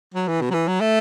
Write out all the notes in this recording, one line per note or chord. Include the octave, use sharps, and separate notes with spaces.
F#3
E3
B2
F#3
E3
F#3
A3